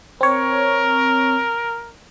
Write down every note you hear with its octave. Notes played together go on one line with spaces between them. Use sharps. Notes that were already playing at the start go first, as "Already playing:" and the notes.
C4 A#4 C#5